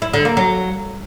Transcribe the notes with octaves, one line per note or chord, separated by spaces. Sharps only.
E4
D3
A#3
F#3